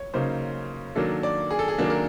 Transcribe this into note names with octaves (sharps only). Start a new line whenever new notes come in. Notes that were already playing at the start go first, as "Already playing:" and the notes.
Already playing: C#5
C#3 F#3 A#3 D#4 C5
D#3 F#3 A#3 D4 A4
D5
G#4
A4
G#4
D#3 F#3 A#3 D4
A#4